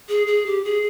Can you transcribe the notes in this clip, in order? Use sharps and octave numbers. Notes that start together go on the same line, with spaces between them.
G#4
G#4
G4
G#4